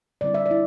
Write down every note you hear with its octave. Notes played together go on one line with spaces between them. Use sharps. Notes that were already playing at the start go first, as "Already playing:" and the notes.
D3 G3 C4 E4 D5
E5
D5
E4